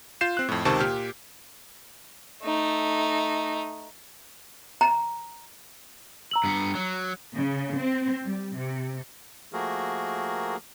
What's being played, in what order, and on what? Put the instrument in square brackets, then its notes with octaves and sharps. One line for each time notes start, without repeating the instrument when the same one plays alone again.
[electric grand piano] F4 G6 C7 E7
C4 F#6
F2 A2
C#2 C3 D#3 C5 A5 C#6
A#2 G4 F6
[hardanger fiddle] A3 D#4
[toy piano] A#5
[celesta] A#5 E6 F#7
[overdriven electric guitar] G2 B3
F#3
[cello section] C#3
C4
G3
C3
[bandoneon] F3 A3 A#3 F#4 G#4 A#4